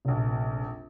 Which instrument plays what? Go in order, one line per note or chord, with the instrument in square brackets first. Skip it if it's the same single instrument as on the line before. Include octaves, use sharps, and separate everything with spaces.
[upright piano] F1 A#1